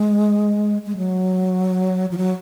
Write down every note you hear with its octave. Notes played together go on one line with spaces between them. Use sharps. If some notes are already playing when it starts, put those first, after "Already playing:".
Already playing: G#3
G#3
F#3
F3
F#3